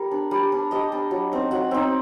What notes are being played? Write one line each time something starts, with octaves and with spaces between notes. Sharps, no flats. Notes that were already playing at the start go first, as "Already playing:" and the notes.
Already playing: G3 G4 A#4
D4
G3
D4
G3 D#5
D4
F#3
C4 D#4
F#3 F#5
C4 D#4